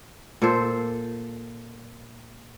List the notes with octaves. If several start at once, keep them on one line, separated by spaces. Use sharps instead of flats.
A#2 A4 C5